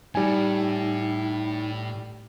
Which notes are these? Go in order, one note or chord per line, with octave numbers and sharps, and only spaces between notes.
A2 G3 D#4 G#5